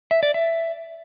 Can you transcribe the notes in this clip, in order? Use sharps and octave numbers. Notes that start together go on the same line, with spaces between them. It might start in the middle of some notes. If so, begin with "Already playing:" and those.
E5
D5
E5